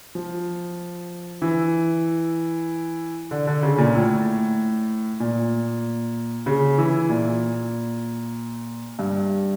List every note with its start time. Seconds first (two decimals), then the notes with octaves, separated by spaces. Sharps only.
0.15 F3
1.42 E3
3.31 D3
3.47 D3
3.63 C#3
3.78 A#2
3.94 A2
5.20 A#2
6.46 C#3
6.78 E3
7.09 A#2
8.99 G2